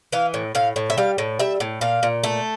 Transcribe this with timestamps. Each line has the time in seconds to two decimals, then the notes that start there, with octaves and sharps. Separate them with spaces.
0.12 E3 F5
0.34 A2
0.55 A2 F5
0.76 A2
0.90 E5
0.98 G3 F5
1.18 A2
1.39 G3 E5
1.60 A2
1.81 A#2 F5
2.03 A#2
2.24 A3